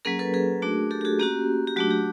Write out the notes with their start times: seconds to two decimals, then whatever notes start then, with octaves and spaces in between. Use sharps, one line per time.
0.05 F#3 A#3 C#4 G#4 A#4
0.19 A4 B4
0.34 G#4 A#4
0.62 A3 D4 F#4
0.91 G4 A4
1.01 G4
1.05 F#4 G#4
1.20 A#3 C#4 F#4 G4
1.67 G4
1.76 F#3 A3 D4 F#4
1.91 G4